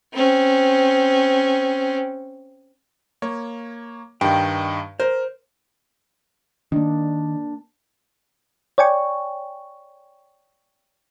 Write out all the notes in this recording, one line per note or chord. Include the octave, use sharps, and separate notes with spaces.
C4 C#4
A#3 C#5
G2 D#3 G5
A#4 C5
D#3 A#3 D4
C#5 D5 G5 G#5 C#6